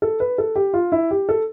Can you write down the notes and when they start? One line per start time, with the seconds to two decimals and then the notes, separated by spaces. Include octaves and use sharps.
0.02 A4
0.20 B4
0.38 A4
0.56 G4
0.74 F4
0.92 E4
1.11 G4
1.29 A4